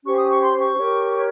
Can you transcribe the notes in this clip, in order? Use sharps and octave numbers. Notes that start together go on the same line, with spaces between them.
C#4 G4 C5 C#6
D#6
C#6
C6
C#6
G4 A#4 C#5